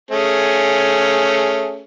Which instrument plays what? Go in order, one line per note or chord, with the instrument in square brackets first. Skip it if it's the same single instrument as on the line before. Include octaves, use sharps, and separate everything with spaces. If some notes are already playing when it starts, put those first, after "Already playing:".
[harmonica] A3 C#4 G#4